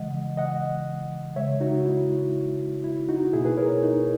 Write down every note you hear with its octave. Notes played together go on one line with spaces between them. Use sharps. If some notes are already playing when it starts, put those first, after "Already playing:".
Already playing: C#3 E3 G#3 D#5 F#5
D#5 F#5
C#3 G#3 C#5 E5
D#4 F#4
E4
E4
D#4 F#4
B2 A#3 E4 G#4
G#4 B4
A#4 C#5
D#4